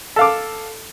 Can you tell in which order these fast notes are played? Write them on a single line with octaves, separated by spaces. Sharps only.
A4 F5 D6